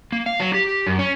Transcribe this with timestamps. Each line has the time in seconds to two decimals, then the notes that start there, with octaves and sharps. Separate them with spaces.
0.12 A#3
0.26 F5
0.40 F#3
0.54 G4
0.87 F#2
0.99 C#4